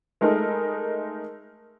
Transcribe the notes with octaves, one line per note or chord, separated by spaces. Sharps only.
G#3 A3 D#4 A#4